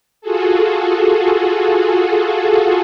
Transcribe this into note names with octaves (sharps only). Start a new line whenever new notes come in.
F4 F#4 G#4 A4